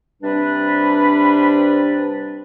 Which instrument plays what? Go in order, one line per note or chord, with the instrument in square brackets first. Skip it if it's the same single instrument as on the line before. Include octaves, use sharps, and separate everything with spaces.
[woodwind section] C3 G3 D4 B4